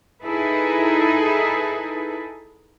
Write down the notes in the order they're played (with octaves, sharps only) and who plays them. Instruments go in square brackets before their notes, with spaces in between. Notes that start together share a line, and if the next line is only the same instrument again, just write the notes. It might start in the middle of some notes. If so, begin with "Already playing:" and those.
[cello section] D#4 E4 G#4 A4 B4